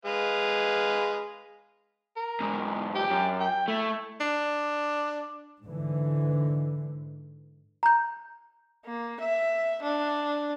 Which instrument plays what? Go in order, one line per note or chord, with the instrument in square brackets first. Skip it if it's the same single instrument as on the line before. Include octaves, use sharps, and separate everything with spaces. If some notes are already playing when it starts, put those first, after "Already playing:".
[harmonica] G#3 B4 F5
[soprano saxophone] A#4
[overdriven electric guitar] E2 G#2
[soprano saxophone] G4
[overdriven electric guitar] F#2
[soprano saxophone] G5
[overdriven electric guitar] A3 [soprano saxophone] E4
[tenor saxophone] D4
[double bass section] G#2 D3 E3
[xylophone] A#5 G6
[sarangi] A#3
E5
D4